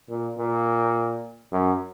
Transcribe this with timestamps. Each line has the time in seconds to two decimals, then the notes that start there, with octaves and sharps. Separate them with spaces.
0.09 A#2
0.38 A#2
1.52 F#2